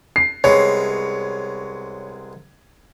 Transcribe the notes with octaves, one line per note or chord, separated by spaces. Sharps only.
C7
C2 G#3 B3 C#5